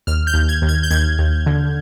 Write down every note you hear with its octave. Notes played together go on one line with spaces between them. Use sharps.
D#2 F6
G6
D#2
G#6
D#2
G#6
G6
D#2 G#6
D#2
D3